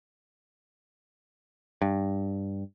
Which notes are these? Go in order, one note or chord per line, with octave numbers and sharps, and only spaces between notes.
G2